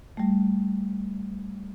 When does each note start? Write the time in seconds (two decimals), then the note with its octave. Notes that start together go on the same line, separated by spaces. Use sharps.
0.17 G3 A3